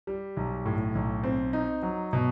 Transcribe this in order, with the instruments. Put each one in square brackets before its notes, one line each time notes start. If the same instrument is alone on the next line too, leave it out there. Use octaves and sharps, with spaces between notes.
[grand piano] G3
B1
A2
B1
C4
D#4
F#3
B2